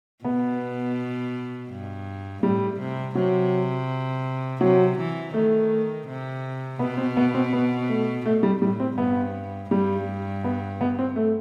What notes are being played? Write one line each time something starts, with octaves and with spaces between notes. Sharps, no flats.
B2 B3
G2
A2 G3
C3
C3 F#3
C3 F#3
E3
D#3 A3
C3
B2 B3
C4
B3
C4
B3
A3
B2 A3
G3
A2 G3
C4
G2 B3
G2 G3
B3
B3
C4
A3